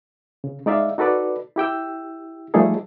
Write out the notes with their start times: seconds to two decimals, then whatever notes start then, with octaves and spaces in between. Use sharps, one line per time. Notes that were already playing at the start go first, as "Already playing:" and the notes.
0.44 C#3
0.66 G#3 D#4 D5 E5 F5
0.98 D#4 F#4 A4 B4 D5
1.56 E4 G4 G5 E6
2.54 F3 G3 A3 D#4 G#4 A4